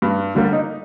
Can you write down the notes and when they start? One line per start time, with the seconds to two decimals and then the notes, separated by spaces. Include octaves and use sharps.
0.02 G2
0.35 D3 G3 A#3
0.53 D#4